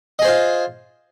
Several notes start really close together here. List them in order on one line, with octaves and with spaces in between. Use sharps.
D#5 G#4 C5 F4